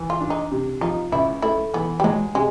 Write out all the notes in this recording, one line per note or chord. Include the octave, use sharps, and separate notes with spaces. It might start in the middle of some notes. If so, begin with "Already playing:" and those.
Already playing: E3
F4
D4
D#4
C3
F3 D#4
C#2 E4
A3 E4
E3 B3
G3
F#3 G#3
C3 G#3